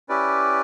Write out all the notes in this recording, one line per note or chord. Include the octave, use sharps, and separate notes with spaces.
C#4 E4 G4 B4 D5